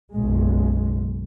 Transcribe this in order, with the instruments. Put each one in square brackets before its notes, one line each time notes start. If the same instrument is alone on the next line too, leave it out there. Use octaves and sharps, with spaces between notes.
[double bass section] F#1 B1 F#2 G#3